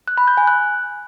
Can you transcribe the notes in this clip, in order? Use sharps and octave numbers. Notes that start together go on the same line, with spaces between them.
F#6
B5
G6
G#5
F#6